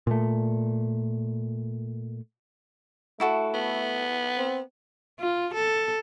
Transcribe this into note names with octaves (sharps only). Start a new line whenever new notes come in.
A#2 A3
A3 E4 F#4 A4
B3
C4
F4
A4